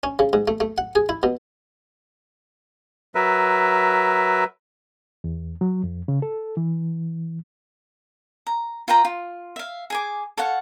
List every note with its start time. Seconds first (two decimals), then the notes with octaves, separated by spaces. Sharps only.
0.03 C#4
0.19 C#3
0.33 G#2
0.48 A3
0.60 A3
0.78 F#5
0.95 G#4
1.09 E4
1.23 B2
3.15 F#3 A#4 B4 E5
5.24 E2
5.61 F#3
5.84 F2
6.08 C#3
6.22 A4
6.57 E3
8.47 A#5
8.88 F4 B4 G5 A#5
9.05 F4
9.56 E5 F5
9.90 G#4 G#5 D6
10.37 A4 C#5 F5 F#5